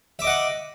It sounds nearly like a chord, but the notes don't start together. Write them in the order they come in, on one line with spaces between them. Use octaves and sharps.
E5 D6 D#5 F#5